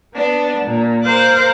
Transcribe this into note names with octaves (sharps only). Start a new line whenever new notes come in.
B3 D4
A#2
A#4 C5 F5 D6 F#6